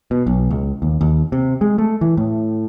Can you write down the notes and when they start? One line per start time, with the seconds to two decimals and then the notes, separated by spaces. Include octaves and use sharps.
0.11 B2
0.27 B1
0.50 C#2
0.82 D#2
1.01 D#2
1.32 C3
1.61 G#3
1.78 A3
2.01 E3
2.17 A2